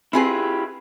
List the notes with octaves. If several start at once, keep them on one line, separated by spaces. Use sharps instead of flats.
C4 E4 F4 G4 G#4 B4